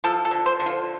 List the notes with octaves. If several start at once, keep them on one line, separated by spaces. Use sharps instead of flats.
F3 A4
A4
D3
C5
D3
F4